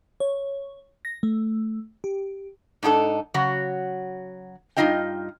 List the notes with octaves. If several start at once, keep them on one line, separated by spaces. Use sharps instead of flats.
C#5
A#6
A3
G4
G#2 D4 D#4 G4 A4
C#3 F#3 F#4
G2 F3 D#4 F4 D#5 G5